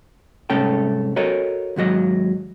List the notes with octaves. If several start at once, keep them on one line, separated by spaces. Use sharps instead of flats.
C2 G#2 A3 C#4 A4 G5
F#4 A4 A#4 C#5 D#5
D#2 G#2 F#3 D#5